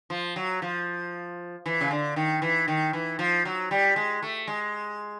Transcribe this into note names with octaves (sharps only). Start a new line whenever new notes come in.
F3
F#3
F3
E3
C#3
D3
D#3
E3
D#3
E3
F3
F#3
G3
G#3
A3
G#3